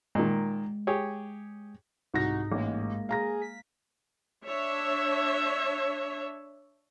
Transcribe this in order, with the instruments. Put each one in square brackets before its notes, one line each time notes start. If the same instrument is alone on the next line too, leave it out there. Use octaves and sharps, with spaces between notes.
[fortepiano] A#2 D#3 [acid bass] G#3
[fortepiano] G4 G#4 C#5
[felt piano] C2 F#4 A#6 [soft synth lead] G#2 [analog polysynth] D#4
[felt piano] A1 [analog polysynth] G#3 A#3
[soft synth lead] G#4 [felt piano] F5 A#5 A#6
[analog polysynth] B6
[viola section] D4 C#5 E5